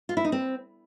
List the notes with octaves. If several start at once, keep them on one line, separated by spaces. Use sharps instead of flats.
F4
E4
D#4
C4